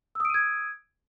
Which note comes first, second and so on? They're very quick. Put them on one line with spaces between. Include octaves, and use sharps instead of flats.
E6 D#6 D7 D#7 G#6